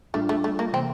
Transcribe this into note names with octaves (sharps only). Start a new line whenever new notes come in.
A2 G3 A3 D4 F4
A3
A3
A#3
C3 E3 A#3 C4